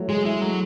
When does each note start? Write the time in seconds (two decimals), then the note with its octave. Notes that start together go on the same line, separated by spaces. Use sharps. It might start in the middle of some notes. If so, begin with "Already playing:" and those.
Already playing: E3 F#3 A3
0.09 G#3 G#4
0.25 G#3 E4
0.41 F#3 A3